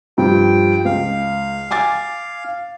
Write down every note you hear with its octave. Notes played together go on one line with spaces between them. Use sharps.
G2 F3 G5
C#2 F5
G#5 D6 A6